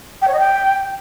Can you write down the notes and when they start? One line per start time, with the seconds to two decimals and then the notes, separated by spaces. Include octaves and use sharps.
0.22 G5
0.27 C#5
0.33 D#5
0.39 G5